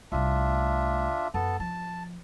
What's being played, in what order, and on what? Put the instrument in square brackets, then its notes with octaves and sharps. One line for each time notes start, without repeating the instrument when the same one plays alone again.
[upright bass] C2 A3 [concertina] D4 F4 E5
[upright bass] F#2 [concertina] B3 A4 A5
[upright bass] F3 [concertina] A5